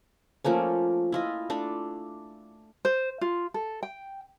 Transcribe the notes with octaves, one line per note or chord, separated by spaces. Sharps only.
F3 A3 A#3 C#4
E4 F4 D#5
A3 D4
C5
F4
A4
G5